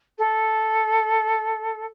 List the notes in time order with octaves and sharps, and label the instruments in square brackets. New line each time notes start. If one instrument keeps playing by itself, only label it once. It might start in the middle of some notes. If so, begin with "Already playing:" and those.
[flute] A4